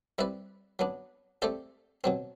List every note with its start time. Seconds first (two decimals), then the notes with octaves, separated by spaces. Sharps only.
0.18 G3 C4 E4 B4 D5
0.79 F#3 B3 D4
1.42 A3 C4 G4 D5
2.04 B2 F#3 C4